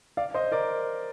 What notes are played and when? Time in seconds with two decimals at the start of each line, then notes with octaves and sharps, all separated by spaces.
0.17 D5 F5
0.34 C5 D#5
0.52 A#4 D5